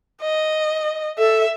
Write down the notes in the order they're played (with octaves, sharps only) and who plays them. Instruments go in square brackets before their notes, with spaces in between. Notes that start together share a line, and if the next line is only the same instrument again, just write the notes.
[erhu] D#5
[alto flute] A4 [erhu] E5